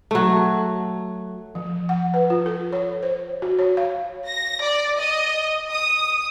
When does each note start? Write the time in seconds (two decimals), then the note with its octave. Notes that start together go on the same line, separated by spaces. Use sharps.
0.11 F#3 A3
1.55 F3
1.89 F#5
2.14 B4
2.30 F4
2.46 A4
2.72 C#5
3.03 C5
3.42 F#4
3.59 C#5
3.77 F5
4.27 A#6
4.62 D5
4.99 D#5
5.70 D#6